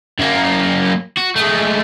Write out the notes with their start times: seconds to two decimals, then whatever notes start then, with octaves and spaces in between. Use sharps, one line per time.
0.19 F#2 A#3
1.17 F#4
1.36 G#3 A3